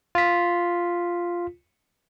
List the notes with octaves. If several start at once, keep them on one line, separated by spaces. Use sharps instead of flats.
F4 B6